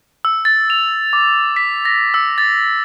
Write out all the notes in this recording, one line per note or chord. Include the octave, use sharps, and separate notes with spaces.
E6
A6
F7
D6
B6
A#6
E6
A6